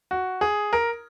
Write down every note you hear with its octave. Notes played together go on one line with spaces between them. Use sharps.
F#4
G#4
A#4